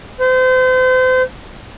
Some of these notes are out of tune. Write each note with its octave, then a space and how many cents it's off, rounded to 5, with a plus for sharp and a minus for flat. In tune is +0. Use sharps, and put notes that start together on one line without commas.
C5 -35